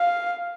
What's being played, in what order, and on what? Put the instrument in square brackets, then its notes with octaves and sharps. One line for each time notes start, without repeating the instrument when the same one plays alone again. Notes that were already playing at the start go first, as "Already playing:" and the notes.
Already playing: [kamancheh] F5